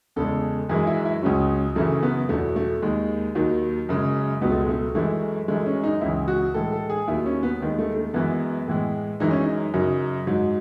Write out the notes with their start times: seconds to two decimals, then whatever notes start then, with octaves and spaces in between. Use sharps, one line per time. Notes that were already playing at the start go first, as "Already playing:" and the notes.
0.16 E2 C#3 G#3 A4
0.69 F#2 E3 G#3 G#4
0.87 E4
1.05 E4
1.22 C#2 C#3 F#3 C#4
1.76 F#2 C#3 E3 A3
2.03 B3
2.29 E2 B2 F#3 A3
2.56 A3
2.82 D#2 D#3 G#3
3.35 D#2 D#3 F#3
3.89 F#2 C#3 G#3
4.41 C#2 B2 F#3 B3
4.51 A3
4.60 G#3
4.69 A3
4.95 F#2 E3 G#3 A3
5.48 F#2 E3 G#3 A3
5.66 C#4
5.84 D#4
6.01 C#2 C#3 E3 E4
6.28 F#4
6.54 A2 E3 G#3 A4
6.72 A4
6.90 G#4
7.07 D#2 D#3 F#3 E4
7.26 C#4
7.43 B3
7.61 D#2 D#3 G#3
7.79 A3
7.96 A3
8.14 F#2 E3 G#3 B3
8.67 A2 E3 G#3
9.20 F#2 E3 G#3 D#4
9.31 C#4
9.41 D#4
9.74 F#2 C#3 F#3
10.27 G#2 F#3